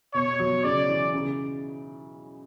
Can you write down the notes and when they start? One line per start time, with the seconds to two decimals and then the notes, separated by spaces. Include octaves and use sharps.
0.14 B2 C#5
0.40 F#3
0.64 C#3 D5
0.89 E3
1.14 C#3